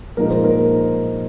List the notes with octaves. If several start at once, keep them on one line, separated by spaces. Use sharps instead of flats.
A#2 F3 G#3 D#4 A#4
C5
A#4